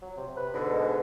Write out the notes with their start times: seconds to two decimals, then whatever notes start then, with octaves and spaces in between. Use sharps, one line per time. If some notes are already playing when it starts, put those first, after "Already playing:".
0.02 F#3
0.17 C3
0.37 B4
0.53 G#2 B2 D3
0.72 G#3